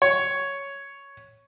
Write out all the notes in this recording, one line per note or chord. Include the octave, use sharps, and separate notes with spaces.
C#5